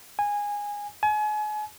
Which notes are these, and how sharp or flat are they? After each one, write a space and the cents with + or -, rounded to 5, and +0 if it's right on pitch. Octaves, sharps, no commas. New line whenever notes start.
G#5 -15
G#5 +35